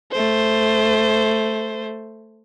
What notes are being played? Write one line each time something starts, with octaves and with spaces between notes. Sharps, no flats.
A3 C5